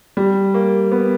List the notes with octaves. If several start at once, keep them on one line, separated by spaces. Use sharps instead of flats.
G3
A#3
B3